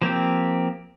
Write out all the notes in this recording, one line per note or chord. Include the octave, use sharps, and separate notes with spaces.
F3 A#3 C4 G4